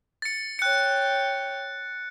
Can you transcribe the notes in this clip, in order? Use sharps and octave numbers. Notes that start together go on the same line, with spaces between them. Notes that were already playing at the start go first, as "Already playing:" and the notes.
A6 C#7
C#5 G5 F#6 C#7